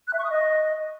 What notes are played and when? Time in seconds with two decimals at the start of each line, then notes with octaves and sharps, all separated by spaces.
0.07 F#6
0.13 E5
0.19 C#6
0.24 D#6
0.30 D#5